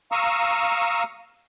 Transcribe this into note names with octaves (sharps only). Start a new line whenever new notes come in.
F5 A#5 C#6 D#6 E6